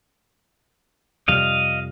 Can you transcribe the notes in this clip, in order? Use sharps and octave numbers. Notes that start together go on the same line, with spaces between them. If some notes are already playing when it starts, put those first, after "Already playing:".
F2 C3 G3 D#5 F5